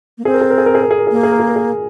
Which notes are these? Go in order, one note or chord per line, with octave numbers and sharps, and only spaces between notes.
A#3
C4 G#4
A#4
G#4
A#4
G#4
A#4
G#4
A#4
G#4
A#4
G#4
A#3 A#4
G#4
A#4
G#4
A#4
G#4